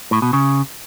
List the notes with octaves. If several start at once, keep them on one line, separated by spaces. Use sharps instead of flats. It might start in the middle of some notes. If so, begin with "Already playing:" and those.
A2
B2
C#3